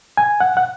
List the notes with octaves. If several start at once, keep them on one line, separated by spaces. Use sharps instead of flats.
G#5
F#5
F#5